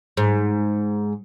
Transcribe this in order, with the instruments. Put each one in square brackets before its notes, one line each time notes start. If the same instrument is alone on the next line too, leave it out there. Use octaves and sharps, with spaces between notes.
[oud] G#2